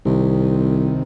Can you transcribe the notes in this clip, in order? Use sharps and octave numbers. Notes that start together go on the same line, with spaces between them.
C2 C3 D#3